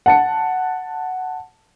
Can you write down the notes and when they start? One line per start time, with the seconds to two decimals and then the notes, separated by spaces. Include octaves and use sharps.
0.06 F#5 A5 C#7